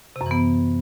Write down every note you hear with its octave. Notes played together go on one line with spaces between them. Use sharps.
C3
F#2
E3
B3